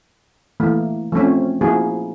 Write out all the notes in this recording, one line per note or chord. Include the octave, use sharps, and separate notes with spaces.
E3 A3 A#3
F3 A3 C4 C#4
F3 A#3 E4 F#4 G#4